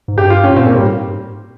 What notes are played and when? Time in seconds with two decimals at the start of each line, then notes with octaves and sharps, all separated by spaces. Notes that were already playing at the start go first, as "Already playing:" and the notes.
0.08 G#2
0.17 G2 G4
0.30 F4
0.44 C#4
0.51 G#2
0.56 A#2 C4
0.66 A#3
0.76 G#2 G3